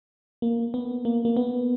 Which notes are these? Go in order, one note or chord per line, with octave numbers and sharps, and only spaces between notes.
A#3
B3
A#3
A#3
B3